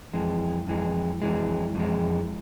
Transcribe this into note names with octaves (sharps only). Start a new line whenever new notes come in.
F2 E3 G#3
F2 E3 G#3
F2 E3 G#3
F2 E3 G#3